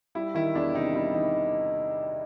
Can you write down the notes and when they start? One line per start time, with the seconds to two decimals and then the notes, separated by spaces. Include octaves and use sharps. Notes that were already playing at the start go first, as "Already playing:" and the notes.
0.15 G3 E4
0.34 D#3 E4
0.55 E2 D4
0.74 C3 D#4
0.94 G3 E4
1.15 D#3 D#4